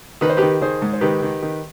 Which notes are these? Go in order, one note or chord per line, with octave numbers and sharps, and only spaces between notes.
D#3 B4
C5
D#3 G4 B4
D#3 G#4 C5
G#2
C5
D#3 G4 B4
D#3
D#3